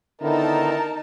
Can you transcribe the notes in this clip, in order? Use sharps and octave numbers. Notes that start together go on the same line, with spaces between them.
D3 D#3 B3 D#4 E4 A#4 A5